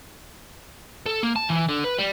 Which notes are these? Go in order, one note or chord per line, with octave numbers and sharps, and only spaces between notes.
A4
A#3
A5
E3
D3
B4
G3